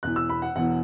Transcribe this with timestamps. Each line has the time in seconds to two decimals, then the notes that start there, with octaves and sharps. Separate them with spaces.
0.03 E1 E2 E3 F#6
0.16 E6
0.30 B5
0.42 F#5
0.56 E1 E2 E3 F#5